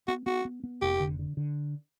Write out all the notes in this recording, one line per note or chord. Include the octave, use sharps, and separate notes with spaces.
B3 F#4
B3 F#4
B3
B3
F1 G4
D3
D3
D3